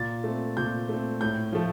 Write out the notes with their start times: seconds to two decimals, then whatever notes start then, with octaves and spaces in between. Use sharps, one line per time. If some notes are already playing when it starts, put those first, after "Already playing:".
Already playing: A#2 A6
0.24 A3 C4
0.57 A#2 G6
0.89 A3 C4
1.21 A2 G6
1.52 F3 A3